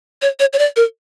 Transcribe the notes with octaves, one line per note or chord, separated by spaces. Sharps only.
C#5
C#5
C#5
D5
A#4